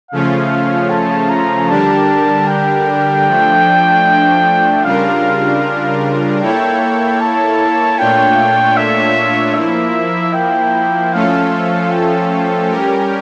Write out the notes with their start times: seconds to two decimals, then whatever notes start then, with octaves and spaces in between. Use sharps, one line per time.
0.11 C#3 F3 A3 C#4 F4 F5
0.90 A5
1.30 A#5
1.69 D3 G3 D4 G4 A#4 A5
2.48 G5
3.27 F3 A3 D4
4.84 C#3 G3 D4 F4 A#4 F5
6.41 A#3 E4 A4 C#5 G5
7.20 A5
7.98 A#2 A3 D4 F4 C#5 G5
8.77 E5
9.55 F3 A#3 E4 E5
10.34 G5
11.12 F3 A3 C#4 F4 A4 F5
11.91 G5
12.70 G3 C#4 G4 A#4